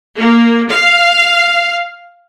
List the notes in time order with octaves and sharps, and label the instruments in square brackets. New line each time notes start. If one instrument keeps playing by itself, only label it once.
[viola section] A#3
F5